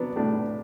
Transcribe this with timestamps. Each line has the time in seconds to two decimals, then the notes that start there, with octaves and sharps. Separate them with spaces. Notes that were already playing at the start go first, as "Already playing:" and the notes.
Already playing: F#3 B3 D4
0.16 A2 D4